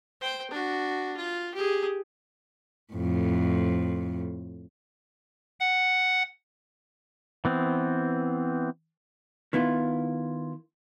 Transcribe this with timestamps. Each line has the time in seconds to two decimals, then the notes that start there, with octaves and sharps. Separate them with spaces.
0.21 C5 G5
0.51 D4 F#4
1.17 F4
1.54 G4 G#4
2.93 F2 A2
5.60 F#5
7.45 E3 B3 C4
9.53 D#3 B3 E4 F4